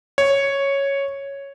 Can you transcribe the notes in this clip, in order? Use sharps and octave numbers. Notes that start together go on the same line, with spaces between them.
C#5